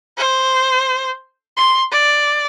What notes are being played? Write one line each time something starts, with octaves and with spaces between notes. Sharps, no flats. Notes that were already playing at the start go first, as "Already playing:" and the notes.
C5
C6
D5